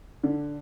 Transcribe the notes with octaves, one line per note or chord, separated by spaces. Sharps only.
D3